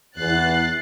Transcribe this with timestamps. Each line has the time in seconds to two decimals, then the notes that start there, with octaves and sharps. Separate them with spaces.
0.18 E2 F#6 A6 C7